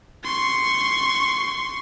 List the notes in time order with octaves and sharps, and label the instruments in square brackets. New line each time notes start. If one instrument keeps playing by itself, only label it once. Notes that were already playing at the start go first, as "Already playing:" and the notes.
[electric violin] C6 C#6